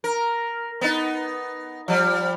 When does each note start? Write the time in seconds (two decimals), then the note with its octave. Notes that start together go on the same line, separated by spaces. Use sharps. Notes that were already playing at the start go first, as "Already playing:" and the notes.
0.04 A#4
0.81 B3 D#4
1.88 F3 G3